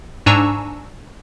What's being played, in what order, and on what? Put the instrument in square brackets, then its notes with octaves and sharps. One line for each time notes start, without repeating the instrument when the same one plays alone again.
[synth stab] G#2 D4 G#5 A#5 C#6 E6